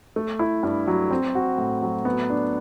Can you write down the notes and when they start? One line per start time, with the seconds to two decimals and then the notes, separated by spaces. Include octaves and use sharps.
0.16 A3
0.39 E4
0.63 G2
0.87 F#3
1.11 C4
1.35 F#4
1.58 A2
1.82 F#3
2.05 B3
2.29 D4